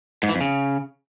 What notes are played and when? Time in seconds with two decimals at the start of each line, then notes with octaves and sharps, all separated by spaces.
0.23 G#2
0.29 E3
0.35 F2
0.41 C#3